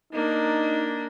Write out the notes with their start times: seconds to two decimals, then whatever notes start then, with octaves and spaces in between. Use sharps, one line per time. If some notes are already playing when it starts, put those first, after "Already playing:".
0.13 A#3 D4 D#4